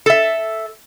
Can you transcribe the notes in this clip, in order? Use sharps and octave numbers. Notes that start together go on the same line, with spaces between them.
A4 E5